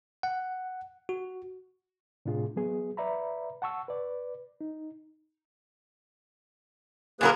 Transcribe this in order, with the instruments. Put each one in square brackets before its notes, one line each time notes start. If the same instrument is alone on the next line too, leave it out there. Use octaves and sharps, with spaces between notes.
[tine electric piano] F#5
F#4
[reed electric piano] A2 C3 D4 F4 G#4
F#3 B3 G#4
B4 D5 E5 A#5 B5
F#5 A5 C#6 E6
B4 D5
D#4
[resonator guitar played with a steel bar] A#2 F#3 A#4 [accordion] A#3 G#4 B4